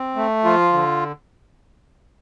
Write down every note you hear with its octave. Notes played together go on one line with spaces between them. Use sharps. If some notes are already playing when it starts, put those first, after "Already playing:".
Already playing: C4
A3
F3 F4
D3